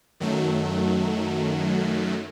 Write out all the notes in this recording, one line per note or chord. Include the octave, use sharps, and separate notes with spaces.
F#2 D#3 F#3 A3